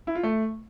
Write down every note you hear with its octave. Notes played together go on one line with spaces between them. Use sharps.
E4
F4
A3